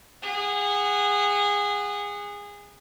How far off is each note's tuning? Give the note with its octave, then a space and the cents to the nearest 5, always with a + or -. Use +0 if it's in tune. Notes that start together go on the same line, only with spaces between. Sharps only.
G#4 -25 F#5 +0